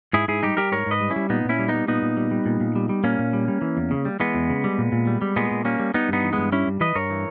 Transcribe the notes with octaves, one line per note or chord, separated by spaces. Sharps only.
G#2 E4 G#4
G#2 E4 G#4
G3 D#4 G4
G3 G4 A#4
G#2 A#4 C#5
G#2 B4 D#5
G3
C#4 E4
G3
A#2 B3 D#4
A#2 C#4 E4
G3
B3 D#4
G3
A#2 B3 D#4
A#2
G3
G3
A#2
A#2
G3
G3
A#2 A#3 C#4
A#2
G3
G3
E3
E2
C#3
G3
E3 G#3 B3
E2
C#3
G3
A#2
A#2
G3
G3
A#2 G#3 B3
A#2
G3 A#3 C#4
G3
G3 B3 D#4
G2 B3 D#4
E3
G2 G#3 B3
G3 C#4 E4
G2
E3 B4 D#5
G2 A#4 C#5
E3